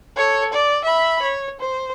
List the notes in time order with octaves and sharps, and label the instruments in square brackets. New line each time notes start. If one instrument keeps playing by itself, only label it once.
[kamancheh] A4 C#5
D5
E5 B5
C#5
C5